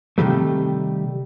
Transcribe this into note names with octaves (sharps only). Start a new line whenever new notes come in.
C3 D#3 G3 A3